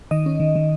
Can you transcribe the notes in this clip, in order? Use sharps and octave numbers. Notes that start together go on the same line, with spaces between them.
D#3 D#5
C#4
D#3
D#3